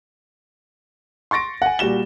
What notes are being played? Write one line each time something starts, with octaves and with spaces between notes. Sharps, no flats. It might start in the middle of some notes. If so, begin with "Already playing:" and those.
C6 C#6 A6 A#6 D7
F#5 G#5
A#2 G3 F#4 E7 G7